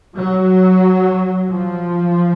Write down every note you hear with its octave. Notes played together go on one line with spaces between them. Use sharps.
F#3
F3